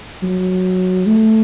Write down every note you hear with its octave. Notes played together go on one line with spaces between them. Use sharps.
F#3
A3